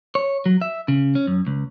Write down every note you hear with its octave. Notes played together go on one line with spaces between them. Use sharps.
C#5
F#3
E5
C#3
C#4
F#2
C#2